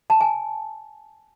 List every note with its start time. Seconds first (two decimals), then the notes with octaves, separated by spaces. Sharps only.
0.10 A5
0.21 G#5